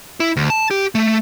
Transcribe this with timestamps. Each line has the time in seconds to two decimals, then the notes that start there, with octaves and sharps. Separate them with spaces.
0.20 E4
0.36 D2
0.50 A5
0.71 G4
0.95 A3